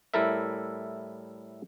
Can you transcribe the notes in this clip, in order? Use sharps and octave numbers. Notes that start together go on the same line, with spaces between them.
A2 G3 E4 A4 A#4 E5